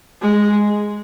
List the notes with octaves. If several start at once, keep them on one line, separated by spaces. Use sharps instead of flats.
G#3